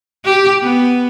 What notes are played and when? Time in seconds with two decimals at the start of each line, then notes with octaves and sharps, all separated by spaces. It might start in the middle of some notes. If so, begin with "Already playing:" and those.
0.25 G4
0.62 B3